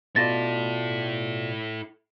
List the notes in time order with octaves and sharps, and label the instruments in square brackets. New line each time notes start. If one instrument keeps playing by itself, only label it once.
[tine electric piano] B2 F4 D5 [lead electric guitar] E4 A4 [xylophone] A6 A#6